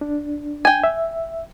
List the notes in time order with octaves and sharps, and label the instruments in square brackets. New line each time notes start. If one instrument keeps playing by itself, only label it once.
[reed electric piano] D4
[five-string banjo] G5 G#5
[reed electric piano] E5